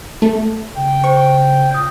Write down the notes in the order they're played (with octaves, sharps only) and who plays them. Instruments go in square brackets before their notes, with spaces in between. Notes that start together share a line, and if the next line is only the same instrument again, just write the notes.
[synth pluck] A3
[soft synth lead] C#3 [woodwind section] G5
[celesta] C5 [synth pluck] C#6
[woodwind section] A#2 [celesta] D#6 G6